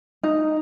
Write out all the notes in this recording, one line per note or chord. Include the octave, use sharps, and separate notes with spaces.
D#4